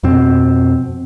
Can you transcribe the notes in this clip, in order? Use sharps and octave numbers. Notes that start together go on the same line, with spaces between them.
F2 B2 C4